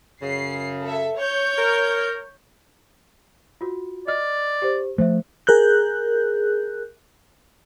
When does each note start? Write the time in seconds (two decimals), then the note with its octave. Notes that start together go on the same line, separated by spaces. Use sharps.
0.22 F#2 C#3 C7
0.83 A4 E5
1.16 C#5 G6
1.58 A#4
3.61 F4 F#4
4.07 D5 D#5 F6
4.62 G4 C5
4.98 F3 A3 C5 E5
5.47 G#4 A#4 F#6 G6